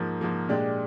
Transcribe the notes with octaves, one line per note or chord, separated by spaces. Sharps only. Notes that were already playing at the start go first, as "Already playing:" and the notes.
Already playing: G#2 F3 A#3
G#2 F3 A#3
A#2 G#3 D4 G4